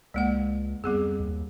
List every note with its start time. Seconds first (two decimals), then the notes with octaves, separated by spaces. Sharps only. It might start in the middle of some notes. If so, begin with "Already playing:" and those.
0.14 C#2 G#3 A#3 F#5
0.84 F2 G3 B3 G#4
1.20 D#2